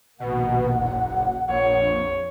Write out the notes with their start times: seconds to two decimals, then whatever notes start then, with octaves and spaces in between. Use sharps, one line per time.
0.20 A#1 D#2 B2 A#3 F#5
0.79 F#1
1.48 A#1 F2 C#5